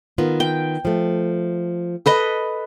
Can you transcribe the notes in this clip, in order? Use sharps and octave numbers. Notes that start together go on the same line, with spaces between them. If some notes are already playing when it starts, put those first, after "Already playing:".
D#3 B3 F4
G5
F3 A3
A4 B4 D#5